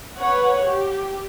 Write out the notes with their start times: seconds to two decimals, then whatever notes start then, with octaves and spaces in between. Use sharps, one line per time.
0.17 B4 C#5 F#5
0.65 G4